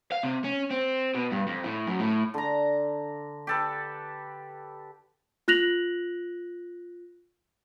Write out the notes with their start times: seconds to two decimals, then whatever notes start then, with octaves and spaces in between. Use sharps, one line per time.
0.12 F5
0.23 C3
0.44 C#4
0.70 C4
1.15 B2
1.32 G2
1.47 F2
1.64 A2
1.87 F#2
2.00 A2
2.34 D3 A#5
3.47 G4 A4 B4
5.48 F4 F#6 A#6 F7 F#7